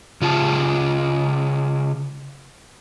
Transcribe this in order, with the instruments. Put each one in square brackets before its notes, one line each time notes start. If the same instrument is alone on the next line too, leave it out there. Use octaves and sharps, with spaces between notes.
[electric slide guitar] C#3 F4 G#4 A5